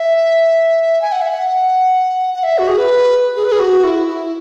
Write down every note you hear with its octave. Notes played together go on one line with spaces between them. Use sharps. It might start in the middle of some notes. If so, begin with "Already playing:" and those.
Already playing: E5
G#5
F#5
E5
F#5
F#5
E5
F#4
G#4
B4
G#4
B4
G#4
F#4
E4
E4